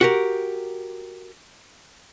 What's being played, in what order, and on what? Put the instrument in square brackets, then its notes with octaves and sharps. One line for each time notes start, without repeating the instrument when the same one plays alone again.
[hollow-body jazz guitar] F#4 G4 A#4